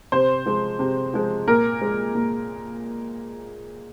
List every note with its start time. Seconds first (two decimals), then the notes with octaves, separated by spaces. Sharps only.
0.12 C3 C5
0.46 F3 G#3
0.79 C3
1.14 F3 G#3
1.47 A#2 A#4
1.82 G#3
2.15 A#2